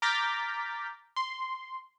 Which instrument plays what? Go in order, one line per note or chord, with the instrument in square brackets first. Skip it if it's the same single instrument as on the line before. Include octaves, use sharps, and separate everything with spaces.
[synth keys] A#5 D6 F6 G6 A6 B6
C6